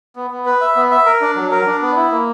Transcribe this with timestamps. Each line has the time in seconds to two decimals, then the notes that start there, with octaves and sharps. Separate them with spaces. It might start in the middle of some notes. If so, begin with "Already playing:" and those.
0.16 B3
0.31 B3
0.46 B4
0.61 E5
0.76 B3
0.91 E5
1.06 A#4
1.21 D4
1.36 F#3
1.51 A#4
1.66 D4
1.82 B3
1.96 E4
2.12 A#3